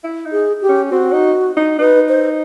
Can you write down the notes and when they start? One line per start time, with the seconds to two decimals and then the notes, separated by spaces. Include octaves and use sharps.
0.04 E4
0.25 D#4
0.32 G#4
0.62 G4
0.69 C#4
0.91 C4 F#4
1.13 D#4
1.57 D#4
1.79 D#4 B4
2.09 C5